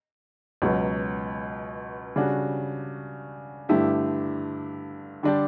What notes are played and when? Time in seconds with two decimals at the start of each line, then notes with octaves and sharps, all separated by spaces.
0.62 C#2 B2 F#3
2.16 C#3 G3 D4 F#4
3.69 G2 D3 A3 E4 G4
5.23 D3 G3 D4 G4